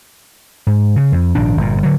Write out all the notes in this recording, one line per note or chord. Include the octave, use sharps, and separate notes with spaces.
G#2
C#3
F2
A#1 G#2 D#3 D4
G1 A#2
D3 F#3